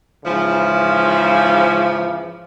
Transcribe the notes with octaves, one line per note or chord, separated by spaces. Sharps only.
G#2 C#3 E3 F3